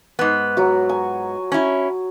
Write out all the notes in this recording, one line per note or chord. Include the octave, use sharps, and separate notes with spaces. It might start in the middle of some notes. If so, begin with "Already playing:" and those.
G#2 B3
F#3 F#4
G#5
C#4 E4